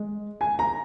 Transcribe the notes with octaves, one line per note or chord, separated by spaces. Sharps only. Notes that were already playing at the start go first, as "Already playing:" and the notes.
Already playing: G#3
G#5
A#5